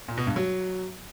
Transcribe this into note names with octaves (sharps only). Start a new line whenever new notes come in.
A#2
B2
G2
F#3